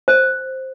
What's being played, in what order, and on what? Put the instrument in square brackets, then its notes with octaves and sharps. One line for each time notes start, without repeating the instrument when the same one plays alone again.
[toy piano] C5